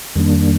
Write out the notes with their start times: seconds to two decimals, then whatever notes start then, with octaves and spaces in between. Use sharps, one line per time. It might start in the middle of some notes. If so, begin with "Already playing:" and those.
0.16 F2 D#3 G3 A#3 D4